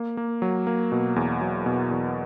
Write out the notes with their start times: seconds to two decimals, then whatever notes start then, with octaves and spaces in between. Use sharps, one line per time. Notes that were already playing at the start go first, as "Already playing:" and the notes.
Already playing: A#3
0.17 A#3
0.42 F#3
0.67 A#3
0.92 B2
1.16 E2
1.41 F#3
1.66 B2
1.91 E2